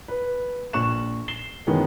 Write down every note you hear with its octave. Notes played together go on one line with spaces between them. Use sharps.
B4
A#1 C#6 F#6 E7
C7 E7 G7
F#2 D#3 E3 G#3 B3